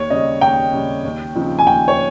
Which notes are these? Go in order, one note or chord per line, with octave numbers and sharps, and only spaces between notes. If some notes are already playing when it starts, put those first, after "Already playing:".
Already playing: D#2 C#5
C#3 G3 D#5
D#2 G5
C#3 G3
D#2
C#3 F3 C4 D#4
G#5
D#2 G5
C#5